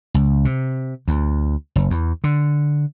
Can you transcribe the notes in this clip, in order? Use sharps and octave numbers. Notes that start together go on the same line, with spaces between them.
C#2
C3
D2
F#1
E2
D3